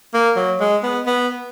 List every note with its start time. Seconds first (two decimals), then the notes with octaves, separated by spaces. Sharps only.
0.14 A#3
0.36 F#3
0.60 G#3
0.83 B3
1.06 B3